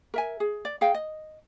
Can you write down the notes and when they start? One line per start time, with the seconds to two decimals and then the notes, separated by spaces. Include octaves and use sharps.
0.14 A#4 E5 G#5
0.40 G#4
0.65 D5
0.81 G#4 F5 G5
0.94 D#5